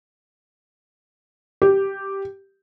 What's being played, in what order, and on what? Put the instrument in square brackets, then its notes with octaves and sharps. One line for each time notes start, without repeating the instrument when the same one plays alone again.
[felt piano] G4